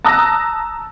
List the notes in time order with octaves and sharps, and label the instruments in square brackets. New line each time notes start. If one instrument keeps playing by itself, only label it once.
[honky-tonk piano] A5 A#5 D#6 E6 F#6 A#6